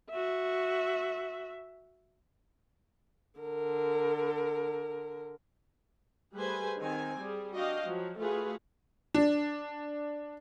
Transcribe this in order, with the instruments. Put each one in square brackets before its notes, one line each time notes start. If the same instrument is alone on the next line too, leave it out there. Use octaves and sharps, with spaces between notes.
[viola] F#4 E5
D3 A#4
[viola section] G3 A3 G#4 B4 C5 G#5
D#3 C4 G#5
G3 G#4
D4 F#4 D#5 F5 G5
F3 F#3
A3 F4 F#4 G#4 B4
[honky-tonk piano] D4